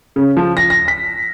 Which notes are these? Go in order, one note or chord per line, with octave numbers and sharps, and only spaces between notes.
C#3
F3
A#6
A#6
B6